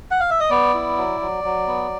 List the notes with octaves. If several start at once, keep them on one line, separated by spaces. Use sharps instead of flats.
F#5
F5
E5
D#5
B3 D5
E4
F#3
F#3
F#3
B3